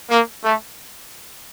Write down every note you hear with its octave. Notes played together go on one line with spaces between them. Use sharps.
A#3
A3